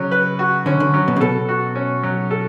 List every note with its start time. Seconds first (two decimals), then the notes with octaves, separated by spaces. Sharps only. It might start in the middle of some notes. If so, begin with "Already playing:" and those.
Already playing: C#3 F#3 C#4
0.11 B4
0.39 F#4
0.66 D3 C#4
0.80 D3
0.94 F#3
1.08 B2
1.16 C#3
1.21 B2 A4
1.49 F#4
1.76 C#4
2.03 F#3
2.31 A4